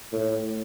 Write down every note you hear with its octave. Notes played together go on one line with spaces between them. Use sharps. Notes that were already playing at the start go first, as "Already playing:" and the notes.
A2